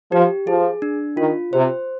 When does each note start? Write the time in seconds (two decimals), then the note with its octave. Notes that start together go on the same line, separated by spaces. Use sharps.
0.11 F3 G4
0.46 F3 G#4
0.82 D4
1.17 D#3 F4
1.53 C3 C5